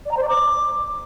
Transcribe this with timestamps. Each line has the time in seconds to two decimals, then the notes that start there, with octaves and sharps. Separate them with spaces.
0.05 D5
0.11 A#5
0.17 C5
0.22 D5
0.28 D6